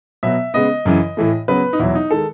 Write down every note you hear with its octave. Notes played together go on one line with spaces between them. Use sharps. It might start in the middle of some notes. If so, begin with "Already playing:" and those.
B2 F#3 B3 E5
C#3 G#3 B3 D#5
F#2 C#3 E3
A2 E3 A3
C#3 F#3 B3 B4
D#4
E2 B2 F#3 E4
D#4
D#3 G#3 A4